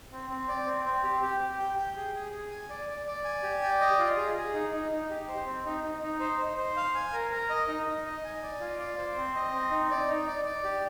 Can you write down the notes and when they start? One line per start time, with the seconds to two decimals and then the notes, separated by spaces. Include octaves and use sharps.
0.12 C4
0.30 C4
0.48 D5
0.66 C4
0.85 C4
1.03 G4
1.22 G4
1.40 G4
1.59 G5
1.78 G5
1.96 G#4
2.15 G#4
2.32 G#4
2.51 G#5
2.70 D5
2.89 D5
3.07 D5
3.25 G#5
3.43 G4
3.63 D5
3.81 D#5
3.99 F4
4.17 G#4
4.37 G#4
4.54 D#4
4.73 D#4
4.92 D#4
5.10 G4
5.29 C5
5.46 C4
5.65 D#4
5.84 D#4
6.02 D#4
6.20 C5
6.39 C5
6.57 C5
6.77 F5
6.95 G#5
7.13 A#4
7.31 A#4
7.50 D#5
7.68 D#4
7.87 D#4
8.05 D#5
8.24 G#5
8.43 D5
8.60 F4
8.79 D5
8.98 C5
9.17 C4
9.35 D#5
9.52 C4
9.71 D#4
9.90 D5
10.09 D#4
10.27 D5
10.45 D5
10.64 G4